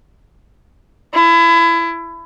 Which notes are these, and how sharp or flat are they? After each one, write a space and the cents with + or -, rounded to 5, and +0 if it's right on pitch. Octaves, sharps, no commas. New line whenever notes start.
E4 +25